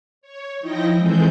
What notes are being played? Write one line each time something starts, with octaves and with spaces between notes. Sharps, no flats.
C#5
F3 D#4 E4 D#5 G5 A#6
E3 G#3 C4 G#4 A4 G6